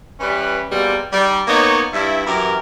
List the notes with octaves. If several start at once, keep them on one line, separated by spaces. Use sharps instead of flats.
E3 G3 C#4 B4
B2 G3 G#3 A#3 C4
G3 D#4
A#3 B3 D#4 C#5
G2 E4
F#2 E3 G4 A#4